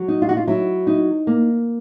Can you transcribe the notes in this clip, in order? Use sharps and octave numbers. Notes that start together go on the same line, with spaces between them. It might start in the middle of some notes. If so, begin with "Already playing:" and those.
Already playing: F#3
D#4
F4
F#4
F4
F#3 E4
D#4
A#3